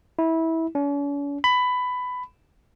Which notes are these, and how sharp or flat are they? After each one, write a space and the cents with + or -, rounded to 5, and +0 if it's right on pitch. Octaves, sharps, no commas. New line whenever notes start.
E4 -20
C#4 +45
B5 +15